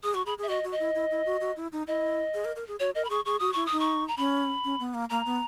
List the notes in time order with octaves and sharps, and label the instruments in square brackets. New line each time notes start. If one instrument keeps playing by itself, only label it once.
[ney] G#4 [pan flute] D#6
[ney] F#4 [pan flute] C#6
[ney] G#4 [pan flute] B5
[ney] G#4
[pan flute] E5
[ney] F#4 [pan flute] D#5
[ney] F#4
[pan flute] D#5
[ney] E4
E4
E4
F#4
F#4
E4
D#4
[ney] E4 [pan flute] D#5
[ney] G#4
A#4
A#4
G#4
[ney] F#4 [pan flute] C#5
[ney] A#4 [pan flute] D#5
[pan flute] B5
[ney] G#4 [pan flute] C#6
[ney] G#4 [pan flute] C#6
[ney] F#4 [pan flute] D#6
[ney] E4 [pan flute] C#6
[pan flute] D#6
[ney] D#4
[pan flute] C#6
A#5
[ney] C#4 [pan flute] B5
[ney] C#4
B3
A#3
[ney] A#3 [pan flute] A#5
[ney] B3